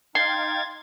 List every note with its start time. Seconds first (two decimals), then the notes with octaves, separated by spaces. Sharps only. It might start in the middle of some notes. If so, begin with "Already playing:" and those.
0.15 D#4 F5 G5 C6 G#6 A6